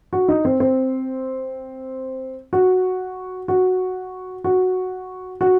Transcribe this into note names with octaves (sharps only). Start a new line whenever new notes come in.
F#4
D#4
C4
C4
F#4
F#4
F#4
F#4